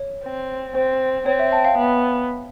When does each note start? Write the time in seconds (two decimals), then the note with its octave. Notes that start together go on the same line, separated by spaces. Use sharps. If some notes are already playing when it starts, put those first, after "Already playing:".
Already playing: C#5
0.25 C4
0.75 C4 C5
1.26 C4 C#5
1.39 E5
1.52 G5 A5
1.64 F5 G5
1.78 B3